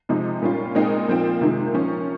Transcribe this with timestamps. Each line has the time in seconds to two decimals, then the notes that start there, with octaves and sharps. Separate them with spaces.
0.09 C3 F3 G#3 D#4
0.42 A#2 G3 C#4 F4
0.75 A#2 G#3 C4 D#4
1.08 A#2 F3 C4 F4
1.41 C3 D#3 G#3
1.74 F3 A#3 C#4